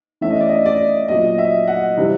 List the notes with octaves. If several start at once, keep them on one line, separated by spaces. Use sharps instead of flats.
E3 A3 C#4 E5
D#5
D5
D#5
D5
A#2 F#3 B3 D#5
E5
F#5
C3 E3 G3 C4